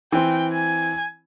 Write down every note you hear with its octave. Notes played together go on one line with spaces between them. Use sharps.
E3 C4 G5
G#5